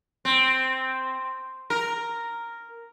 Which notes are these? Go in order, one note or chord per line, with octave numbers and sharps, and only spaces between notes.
C4
A#4